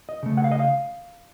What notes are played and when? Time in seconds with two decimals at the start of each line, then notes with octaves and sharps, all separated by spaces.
0.09 D#5
0.23 C#3 A3
0.37 F#5
0.44 F5
0.52 D#5
0.59 F5